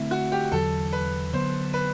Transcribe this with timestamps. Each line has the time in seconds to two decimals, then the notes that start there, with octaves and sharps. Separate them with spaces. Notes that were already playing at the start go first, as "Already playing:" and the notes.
Already playing: D3 A3 C4 E4
0.11 F#4
0.32 G4
0.52 E2 D3 F#3 A4
0.92 B4
1.33 D3 F#3 B3 C5
1.74 B4